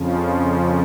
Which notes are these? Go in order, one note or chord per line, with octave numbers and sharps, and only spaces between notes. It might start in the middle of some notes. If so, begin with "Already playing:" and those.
Already playing: F2 C#3 F3